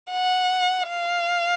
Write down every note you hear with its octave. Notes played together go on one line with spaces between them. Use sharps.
F#5
F5